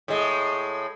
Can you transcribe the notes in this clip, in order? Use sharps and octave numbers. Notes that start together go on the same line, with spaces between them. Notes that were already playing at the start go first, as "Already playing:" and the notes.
A2 G#3